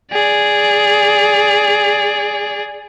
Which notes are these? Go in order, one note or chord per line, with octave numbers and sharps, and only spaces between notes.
G#4 D5